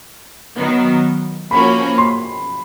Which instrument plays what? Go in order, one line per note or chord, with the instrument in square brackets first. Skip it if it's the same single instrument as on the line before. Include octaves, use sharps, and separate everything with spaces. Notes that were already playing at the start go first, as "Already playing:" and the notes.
[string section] D#3 F#3 B3
[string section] F3 A#3 C#4 F#4 [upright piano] B5
[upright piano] C6